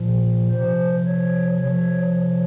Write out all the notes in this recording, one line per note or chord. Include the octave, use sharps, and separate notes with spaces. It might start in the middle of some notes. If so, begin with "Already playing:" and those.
Already playing: A#2 F3
C3 F3 C5
C#5
C3 F3 C#5